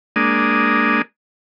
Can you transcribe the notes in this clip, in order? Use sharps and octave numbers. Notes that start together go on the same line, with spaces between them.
G#3 A#3 D4 D#6